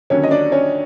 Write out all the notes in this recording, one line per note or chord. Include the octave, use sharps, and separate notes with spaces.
D#2 D3 F#3 C#4 C#5
D#5
D4 D5
C#4 C#5